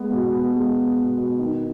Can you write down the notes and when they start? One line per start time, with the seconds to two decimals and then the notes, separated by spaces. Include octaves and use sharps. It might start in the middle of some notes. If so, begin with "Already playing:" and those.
Already playing: G#3 B3
0.13 B2
0.34 B3
0.54 G#3
0.76 B3
0.97 B2
1.18 B2
1.39 D#3